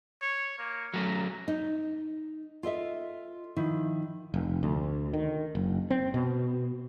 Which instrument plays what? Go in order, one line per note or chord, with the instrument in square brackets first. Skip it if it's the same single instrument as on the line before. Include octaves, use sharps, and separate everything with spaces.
[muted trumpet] C#5
A#3
[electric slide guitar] F#3 A3 C#4 [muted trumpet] A#5
[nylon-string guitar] D#4
F4 A4 D#5 E5
D#3 F3 E4
[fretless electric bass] F1
D2
D#3
F#1
C4
B2